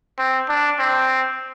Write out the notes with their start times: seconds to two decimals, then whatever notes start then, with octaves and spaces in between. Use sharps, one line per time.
0.19 C4
0.49 D4
0.79 C4